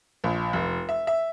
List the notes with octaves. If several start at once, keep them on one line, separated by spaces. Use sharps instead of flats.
A#1
F1
E5
E5